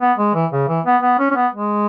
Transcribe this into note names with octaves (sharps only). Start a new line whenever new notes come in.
B3
G#3
E3
C#3
E3
B3
B3
C#4
C#4
B3
G#3